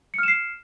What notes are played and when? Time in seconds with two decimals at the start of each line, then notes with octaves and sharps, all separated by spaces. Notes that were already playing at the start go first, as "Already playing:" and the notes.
0.14 C#7
0.18 F6
0.23 E7
0.28 C7